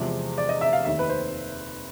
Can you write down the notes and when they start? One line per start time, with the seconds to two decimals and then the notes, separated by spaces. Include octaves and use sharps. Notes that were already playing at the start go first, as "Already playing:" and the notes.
Already playing: E2 C3 F3 G#3
0.38 D5
0.49 D#5
0.61 E5
0.73 F5
0.85 F1 D#2 D#3 E5
0.99 B4
1.09 C5